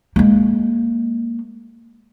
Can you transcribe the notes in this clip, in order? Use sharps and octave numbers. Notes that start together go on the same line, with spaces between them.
G#3 A#3